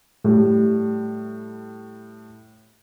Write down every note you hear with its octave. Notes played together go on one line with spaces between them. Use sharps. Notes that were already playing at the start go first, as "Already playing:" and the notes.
A2 G3